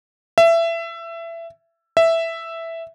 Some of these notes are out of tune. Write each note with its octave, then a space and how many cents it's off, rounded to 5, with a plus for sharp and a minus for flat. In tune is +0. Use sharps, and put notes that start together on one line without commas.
E5 +20
E5 +0